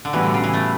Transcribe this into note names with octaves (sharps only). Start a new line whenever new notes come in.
D3
A2 E3 G3 B3 F#4
D3
C#3
E3
A3